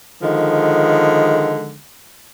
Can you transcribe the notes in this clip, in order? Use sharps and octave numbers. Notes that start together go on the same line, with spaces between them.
D3 D#3 F3 G#3